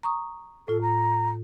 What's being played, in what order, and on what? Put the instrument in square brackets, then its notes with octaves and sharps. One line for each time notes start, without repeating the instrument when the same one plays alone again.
[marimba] A#5 C#6 D#6
[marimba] A2 F4 [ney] A4
[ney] A#5